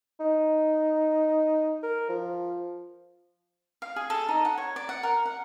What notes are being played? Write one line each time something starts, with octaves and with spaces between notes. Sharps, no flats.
D#4
A#4
F3
F5
G#4
A4
D#4
F#5
C#5
D5
F#5
A#4
F#5